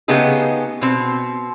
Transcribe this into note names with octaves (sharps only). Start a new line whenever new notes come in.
C#3 A3 B3 D#4 G4 G#4
B2 C4